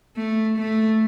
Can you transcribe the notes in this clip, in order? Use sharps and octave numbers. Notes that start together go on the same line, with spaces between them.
A3
A3